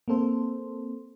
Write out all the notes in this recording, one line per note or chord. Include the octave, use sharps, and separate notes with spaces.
A#3 C4 A4 C5